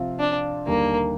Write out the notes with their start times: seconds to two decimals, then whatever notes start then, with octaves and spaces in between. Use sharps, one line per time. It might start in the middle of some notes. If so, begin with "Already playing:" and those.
Already playing: C3 F3 C4 F4
0.19 D4
0.67 D#2 D3 G3 A#3